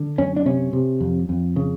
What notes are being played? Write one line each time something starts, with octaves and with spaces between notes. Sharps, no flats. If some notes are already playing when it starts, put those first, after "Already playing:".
Already playing: D3
F#2 C#4
D4
C3 C#4
C3
F2
F2
C#3